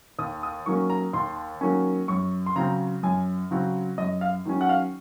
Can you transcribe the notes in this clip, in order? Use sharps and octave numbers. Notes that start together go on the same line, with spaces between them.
D#2 D#6
D#6
D#3 F#3 A#3 C#4 C#6
A#5
D#2 C6
D#3 F#3 A#3 C#4
F#2 C#6
C6
C#3 F#3 C4 A#5
F#2 G#5
C#3 F#3 C4
F#2 D#5
F5
D#3 F#3 C#4
F#5
F5